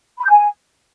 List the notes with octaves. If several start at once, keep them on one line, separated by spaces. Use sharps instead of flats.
B5
G6
G#5